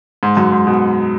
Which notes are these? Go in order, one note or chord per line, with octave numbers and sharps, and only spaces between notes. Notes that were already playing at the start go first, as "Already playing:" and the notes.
G#2
F#2
G#2
B2